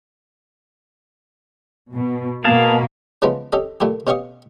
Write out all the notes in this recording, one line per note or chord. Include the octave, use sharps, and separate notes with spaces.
B2
B2 A#3 G#4 F5 A5
C#3 E3 F3 G#3 B3 C#4
C#4 G4 A4 D#5
A#2 A3 E4 G4
B2 C#4 G4 F5 C#6 D#6